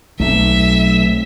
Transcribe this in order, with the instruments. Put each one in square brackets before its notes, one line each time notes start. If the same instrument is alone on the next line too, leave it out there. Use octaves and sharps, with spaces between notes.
[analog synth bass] B1 [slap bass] A3 C4 [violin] E5